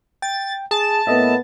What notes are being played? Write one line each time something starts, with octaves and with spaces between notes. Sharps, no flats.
G5 A6
G#4 A5
A2 A#3 B3 A4 D#5 E5